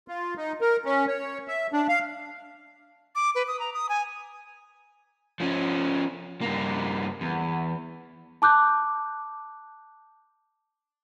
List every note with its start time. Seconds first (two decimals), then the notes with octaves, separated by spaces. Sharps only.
0.08 F4
0.37 D#4
0.61 A#4
0.85 C#4
1.08 C#5
1.48 E5
1.73 D4
1.89 F5
3.15 D6
3.35 B4
3.48 D#6
3.59 A#5
3.74 D#6
3.89 G#5
5.40 F3 C#4
6.41 G2 A#3
7.21 E2
8.42 A5 D6 F#6 G6